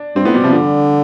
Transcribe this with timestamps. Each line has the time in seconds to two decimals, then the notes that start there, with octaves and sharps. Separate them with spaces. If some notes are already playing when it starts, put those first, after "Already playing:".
Already playing: D4
0.15 G2 C4
0.25 A2 B3
0.34 B2 G3
0.44 C3 F3
0.53 D3 G3